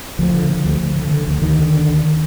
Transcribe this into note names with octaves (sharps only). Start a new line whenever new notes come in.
D2 F3
D3
D3
D2
D2
D3
D3
D2
D2 D#3
D3
D3
D2